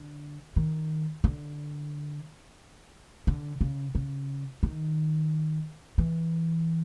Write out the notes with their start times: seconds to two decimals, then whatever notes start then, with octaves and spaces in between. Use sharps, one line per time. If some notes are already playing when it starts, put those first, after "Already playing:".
Already playing: D3
0.56 D#3
1.24 D3
3.27 D3
3.61 C#3
3.95 C#3
4.63 D#3
5.98 E3